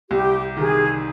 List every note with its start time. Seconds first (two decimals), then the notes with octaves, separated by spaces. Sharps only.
0.10 C2 G4
0.57 C3 D#3 G#4